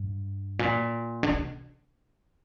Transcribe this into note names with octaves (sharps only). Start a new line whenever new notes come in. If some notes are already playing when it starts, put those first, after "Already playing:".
Already playing: G2
A#2
D3
C3